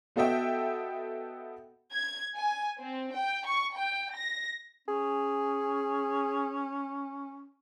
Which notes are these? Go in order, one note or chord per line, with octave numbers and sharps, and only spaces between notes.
B3 F#4 A4 D#5 E5 G5
G#6
G#5
C4
G5
C#6
G5
A#6
C#4 G#4